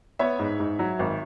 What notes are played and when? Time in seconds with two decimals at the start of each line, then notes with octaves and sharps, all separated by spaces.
0.19 B3 C#5 E5
0.39 G#2
0.60 G#2
0.79 F#3
0.99 G#1